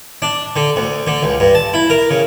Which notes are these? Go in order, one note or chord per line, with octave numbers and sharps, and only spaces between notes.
D4
D3
D2
D3
C#2
G2
A5
E4
A#4
C#3